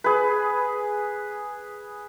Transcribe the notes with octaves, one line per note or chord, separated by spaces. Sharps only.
G#4 B4